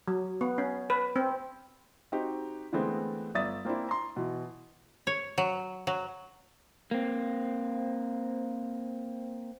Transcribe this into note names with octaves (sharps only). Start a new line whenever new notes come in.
F#3
B3
C#4
B4
C4
C4 D#4 F#4 G4
D3 E3 G#3 A3 B3 C4
G1 D5 E5 D#6 A6
A#3 C4 D4 E4
A#5 C6
B2 E3
C#5
F#3
F#3
A#3 C4